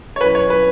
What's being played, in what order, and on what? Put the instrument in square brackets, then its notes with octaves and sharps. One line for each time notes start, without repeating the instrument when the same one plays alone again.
[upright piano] C#5
[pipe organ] B2 F#3 C#4 E4 [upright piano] B4
[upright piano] C#5
B4